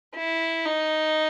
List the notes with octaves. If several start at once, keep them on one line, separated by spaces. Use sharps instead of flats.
E4
D#4